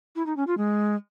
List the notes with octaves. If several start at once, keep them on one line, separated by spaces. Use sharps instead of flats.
E4
D#4
C#4
F4
G#3